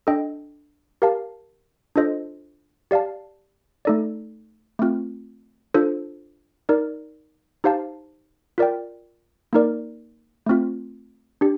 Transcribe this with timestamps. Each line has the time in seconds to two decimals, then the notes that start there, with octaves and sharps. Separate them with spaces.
0.07 D4 A4 D#5 G5
1.02 G4 A#4 F5 A5
1.96 D4 F4 A4 C5 D#5
2.91 G4 D5 F5 A5
3.85 A3 D#4 A4 D5
4.79 A3 C4 F4
5.74 D4 F4 A4 C5
6.69 D#4 A#4 D5
7.64 D#4 G4 C5 F5 A5
8.58 F4 A#4 D5 G5
9.53 A#3 D#4 A#4 D5
10.46 A3 C4 F4
11.41 D4 G4